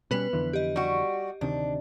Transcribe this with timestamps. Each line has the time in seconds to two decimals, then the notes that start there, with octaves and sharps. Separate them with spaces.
0.11 B2 G3 B3 C#4 B4
0.33 F2 D3 E3
0.53 G4 D#5
0.76 G3 F#4
1.41 D2 C3 D#3 D4